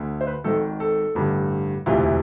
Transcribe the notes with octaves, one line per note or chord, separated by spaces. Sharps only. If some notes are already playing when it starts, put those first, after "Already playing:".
Already playing: D2 D3
C5
B4
G#1 G#2 D#3 A4
A4
A1 G2 D3
E1 D2 C3 E3 F4